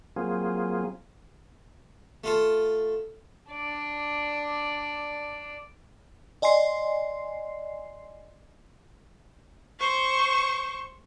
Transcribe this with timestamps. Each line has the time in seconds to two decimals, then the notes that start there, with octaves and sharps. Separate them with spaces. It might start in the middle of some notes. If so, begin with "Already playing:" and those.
0.16 F#3 A#3 C4 F4 G#4
2.24 A3 F4 A4
3.51 D4 D5
6.42 D5 D#5 G#5 C6 C7
9.79 C5 C#6